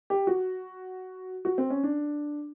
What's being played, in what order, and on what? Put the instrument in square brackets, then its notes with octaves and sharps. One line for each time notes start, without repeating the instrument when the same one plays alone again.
[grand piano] G4
F#4
F#4
C4
C#4
D4